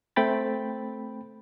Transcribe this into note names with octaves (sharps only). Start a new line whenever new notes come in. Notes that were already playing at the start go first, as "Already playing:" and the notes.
A3 C4 G5 B5 A6